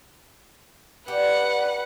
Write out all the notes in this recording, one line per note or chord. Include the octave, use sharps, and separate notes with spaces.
D4 G4 B4 F#5